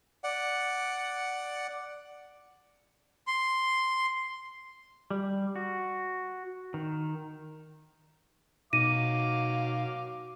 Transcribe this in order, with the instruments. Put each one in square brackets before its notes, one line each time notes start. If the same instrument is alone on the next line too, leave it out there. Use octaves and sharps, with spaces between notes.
[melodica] D5 F#5
[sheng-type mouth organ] C6
[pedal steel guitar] G3
F#4
D#3
[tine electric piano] B2 D#4 A#6 [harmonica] F#3 F5 D6 [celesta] D#7